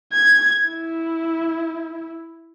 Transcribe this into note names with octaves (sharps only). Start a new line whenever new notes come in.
G#6
E4